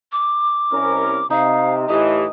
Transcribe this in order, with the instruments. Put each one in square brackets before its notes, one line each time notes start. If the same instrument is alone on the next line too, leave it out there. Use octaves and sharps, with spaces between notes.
[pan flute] D6
[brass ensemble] C2 C#4 A#4
[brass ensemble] C3 [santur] D#4 [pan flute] F5
[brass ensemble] A2 E3 [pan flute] G4 [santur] D#5